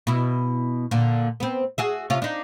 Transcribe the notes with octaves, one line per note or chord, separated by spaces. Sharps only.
B2 E4
A#2 D3
B3 C4
F#4 G#4 E5
C3 C#4 F4
D4 D#4